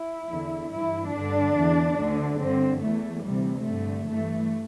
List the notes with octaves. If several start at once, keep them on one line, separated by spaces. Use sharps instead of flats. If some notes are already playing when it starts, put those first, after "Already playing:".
Already playing: E4
E2 D3
G2 E3 E4
G2 D3 D4
E2 E3
D2 D3
G2 D3 C4
E2 E3 A3
D2 C3 E3 G3
G2 D3 A3
G2 E3 A3